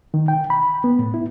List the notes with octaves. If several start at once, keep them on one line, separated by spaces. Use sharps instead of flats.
D#3
G5
B5
B3
A2
E4